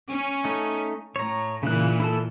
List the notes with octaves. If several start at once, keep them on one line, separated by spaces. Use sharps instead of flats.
C#4
A3 D#4
A2 C#5 A#5
A#2 C#3 E3 F#6
E4 A4 A5